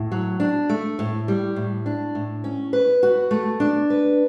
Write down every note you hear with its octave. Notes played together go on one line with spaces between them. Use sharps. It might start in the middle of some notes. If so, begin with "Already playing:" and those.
Already playing: A2
F#3
D4
A3
A2
G3
A2
D4
A2
C#4
B4
F#4
A3
D4
B4